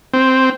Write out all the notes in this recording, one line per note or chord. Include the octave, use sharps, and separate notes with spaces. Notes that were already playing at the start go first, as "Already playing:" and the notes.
C4